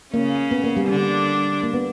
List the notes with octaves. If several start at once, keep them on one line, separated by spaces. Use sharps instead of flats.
C#3 A#3 C#4
B3
A#3
G3
D3 D4
A#3
B3